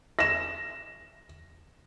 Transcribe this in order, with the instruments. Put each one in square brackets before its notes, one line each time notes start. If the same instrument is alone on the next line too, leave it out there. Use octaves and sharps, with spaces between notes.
[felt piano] A#6 E7